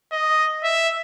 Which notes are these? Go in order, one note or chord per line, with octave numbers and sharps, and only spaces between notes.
D#5
E5